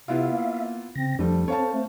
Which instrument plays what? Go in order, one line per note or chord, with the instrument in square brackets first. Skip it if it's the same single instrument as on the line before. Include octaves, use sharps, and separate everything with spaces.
[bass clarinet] C3 [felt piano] B3 E4 F4 [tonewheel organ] E5 F5
[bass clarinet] A#3
[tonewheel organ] C#3 A#6 [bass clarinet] C4
[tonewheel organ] F2 D4 [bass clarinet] F3 [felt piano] G3 A3
[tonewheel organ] C4 C5 [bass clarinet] A4 [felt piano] C#5 F5 A5
[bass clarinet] A3